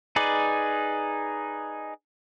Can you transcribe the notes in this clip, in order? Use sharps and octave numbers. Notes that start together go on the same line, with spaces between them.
D#4 G#4 B4 D5